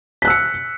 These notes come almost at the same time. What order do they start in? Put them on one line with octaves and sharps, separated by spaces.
B6 F#6 E6 C#7